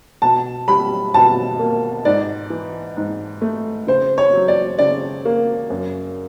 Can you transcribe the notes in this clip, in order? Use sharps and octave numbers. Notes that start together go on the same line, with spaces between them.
B2 A5
G3 B5
B2 A5
A#3
G#2 D5
E3
G#2
A3
C#3 C5
C#5
F#3
D5
C#3 D5
A#3
F#2